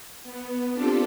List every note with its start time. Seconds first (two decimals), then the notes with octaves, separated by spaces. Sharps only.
0.23 B3
0.73 C4 D4 F4 G4 A4